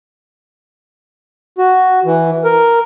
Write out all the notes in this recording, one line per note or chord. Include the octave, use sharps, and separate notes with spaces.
F#4
E3
A#4